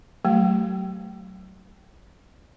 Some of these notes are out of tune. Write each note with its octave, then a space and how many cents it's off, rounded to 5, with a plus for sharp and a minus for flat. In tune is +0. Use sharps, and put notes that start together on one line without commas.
F#3 +25 A3 +0 G4 -35